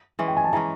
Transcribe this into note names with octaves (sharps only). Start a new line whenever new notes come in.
E3 G#3 C#4
G5
G#5
A5
E3 G#3 C#4 A#5